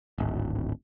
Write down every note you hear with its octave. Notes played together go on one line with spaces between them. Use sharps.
D1 G#1